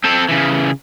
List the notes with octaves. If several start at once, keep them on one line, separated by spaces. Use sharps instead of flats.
C4 A4
C#3 E3